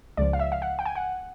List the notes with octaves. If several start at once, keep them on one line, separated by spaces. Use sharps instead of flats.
C#2 C#3 F3 D5
F5
E5
F5
F#5
G5
G#5
F#5